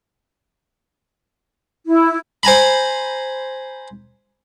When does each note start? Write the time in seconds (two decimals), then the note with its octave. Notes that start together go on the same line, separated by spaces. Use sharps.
1.86 E4
2.43 C5 G#5 A#5 B5